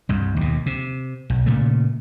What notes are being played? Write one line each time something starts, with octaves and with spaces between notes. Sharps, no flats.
C2 G2
D#2 B2
C3
B1
A#2 C#3 A3